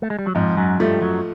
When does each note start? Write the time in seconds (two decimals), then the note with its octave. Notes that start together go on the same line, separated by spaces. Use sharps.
0.02 A3
0.10 G#3
0.19 G3
0.27 F#3
0.35 F2 G#2 F3
0.57 F#2 F#3
0.80 G2 F3 G3 A3
1.02 F#2 F#3